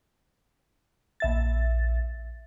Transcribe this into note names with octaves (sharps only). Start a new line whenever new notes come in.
A#1 E5 A6